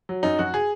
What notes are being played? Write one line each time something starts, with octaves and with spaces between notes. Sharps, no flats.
F#3
F#2 D#4
F#2 F#4
G#4